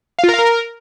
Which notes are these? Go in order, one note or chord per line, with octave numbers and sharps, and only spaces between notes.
F5
F4
A#4
F5
A#4